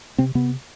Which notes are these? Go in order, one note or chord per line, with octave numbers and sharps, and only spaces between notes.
C3 C4
C3 B3